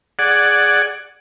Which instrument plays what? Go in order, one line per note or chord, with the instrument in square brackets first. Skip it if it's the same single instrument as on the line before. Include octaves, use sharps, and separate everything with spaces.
[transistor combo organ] G#4 D5 F#5